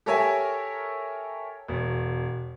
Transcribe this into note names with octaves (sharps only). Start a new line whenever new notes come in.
G4 A4 A#4 C#5 E5 G#5
E1